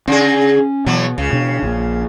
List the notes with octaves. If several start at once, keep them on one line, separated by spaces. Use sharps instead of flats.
C#3 C#4 G#4
E2 B2 F#3
C#2 C#3
B2 D4
A#1 A#2